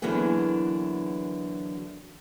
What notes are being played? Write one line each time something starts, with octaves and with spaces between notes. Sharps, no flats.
D3 E3 F#3 A#3 B3 G#4